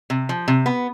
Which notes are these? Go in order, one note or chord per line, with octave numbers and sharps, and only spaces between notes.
C3
F3
C3
B3